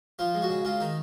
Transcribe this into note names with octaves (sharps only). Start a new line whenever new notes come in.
F3 F4
G#3
F#4
C#3
G#3 F4
D#3 D#4